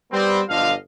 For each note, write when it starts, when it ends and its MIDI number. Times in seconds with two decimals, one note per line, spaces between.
0.12 0.41 55
0.12 0.41 59
0.12 0.41 60
0.49 0.73 31
0.49 0.73 50
0.49 0.73 53
0.49 0.73 75
0.49 0.73 77